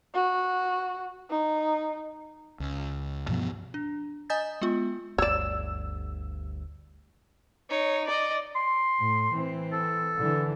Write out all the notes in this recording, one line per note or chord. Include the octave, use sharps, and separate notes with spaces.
F#4
D#4
C#2
G2 B2 F3 B3
D4
D#5 G#5 A#5 D#6 G6 A6
G#3 B3 F4
G1 D2 G2 C#5 D5 E6 E7
D#4 C#5
D5 D#5
C6
A2
E3 C4
A4
D3 E3